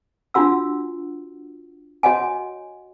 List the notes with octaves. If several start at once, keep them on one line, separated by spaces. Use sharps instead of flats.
D4 F4 F#4 F#5 E6
F#4 C#5 D#5 F#5 G#5